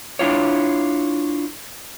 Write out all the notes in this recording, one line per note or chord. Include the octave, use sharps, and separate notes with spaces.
D4 E4 F4 C#5